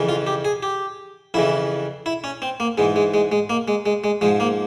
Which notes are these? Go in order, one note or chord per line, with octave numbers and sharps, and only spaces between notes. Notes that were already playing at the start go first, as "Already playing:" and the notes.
Already playing: F2 C#3 E3
F4
G4
G#4
G4
F2 C#3 E3 E4
E4
C#4
C4
A#3
G#2 E3 G#3
G#3
G#3
G#3
A#3
G#3
G#3
G#3
G#2 F3 G#3
A#3